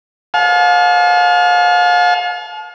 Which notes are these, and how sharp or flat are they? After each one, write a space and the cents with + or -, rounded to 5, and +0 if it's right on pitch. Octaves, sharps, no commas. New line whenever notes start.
F5 +35 A5 -40